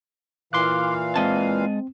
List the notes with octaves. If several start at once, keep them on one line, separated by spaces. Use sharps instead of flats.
A#2 E3 F5 C6 D6 F#6
G#3 C4 D#5 A5